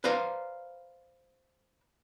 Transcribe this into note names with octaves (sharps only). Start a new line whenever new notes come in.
B4 C5 D5 F5 A#5